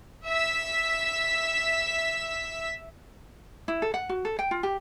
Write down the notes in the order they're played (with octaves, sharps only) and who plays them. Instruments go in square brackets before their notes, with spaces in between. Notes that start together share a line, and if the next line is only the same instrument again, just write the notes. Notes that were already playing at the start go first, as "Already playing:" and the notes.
[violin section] E5 E6 B6
[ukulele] E4
A4
F#5
F#4
A4
G5
F4
G4